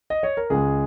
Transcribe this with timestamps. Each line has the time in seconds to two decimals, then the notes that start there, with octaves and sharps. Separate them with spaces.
0.10 D#5
0.23 C#5
0.37 A#4
0.50 C#2 C#3 G#3 G#4